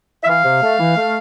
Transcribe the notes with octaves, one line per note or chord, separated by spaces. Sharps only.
E5
E3 F5
C3
A3
E3
A3